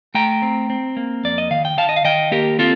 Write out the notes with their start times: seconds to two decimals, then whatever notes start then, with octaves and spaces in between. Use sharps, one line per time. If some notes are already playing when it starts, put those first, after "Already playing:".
0.14 A3 G5 A#5
0.42 C4
0.70 C4
0.97 A#3
1.24 F2 D5
1.38 D#5
1.51 D#3 F5
1.65 G5
1.77 D#3 F5 A5
1.89 D#5
1.96 F5
2.04 D#3 D#5 G5
2.32 A#3 G4 A#4
2.59 C4 F4 A4